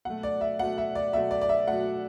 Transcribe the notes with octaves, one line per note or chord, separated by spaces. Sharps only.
B2 F#3 A3 F#5
D5
E5
B2 F#3 A3 F#5
E5
D5
B2 F#3 A3 E5
D5
D5
E5
B2 F#3 A3 F#5